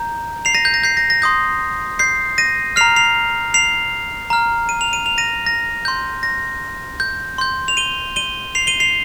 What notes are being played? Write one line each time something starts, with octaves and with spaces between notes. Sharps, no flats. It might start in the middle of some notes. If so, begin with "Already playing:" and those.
Already playing: A#5 G6
C7 F7
A#6 D#7
G6
A#6
G6 C7
A#6
A#6
C6 D#6 G6
G6 C7
A#6 D#7
A#5 F6 C7 F7
C7 F7
C7 F7
A#5 F6
D#7
F7
D#7
F7
A#6 D#7
A#6
C6 G6
A#6
G6
C6 G6
F7
D#7 G7
D#7 G7
C7 F7
D#7 G7
C7 F7